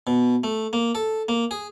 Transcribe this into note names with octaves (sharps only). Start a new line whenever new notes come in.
B2
A3
A#3
A4
A#3
G#4